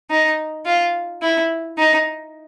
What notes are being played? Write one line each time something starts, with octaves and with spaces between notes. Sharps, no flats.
D#4
F4
E4
D#4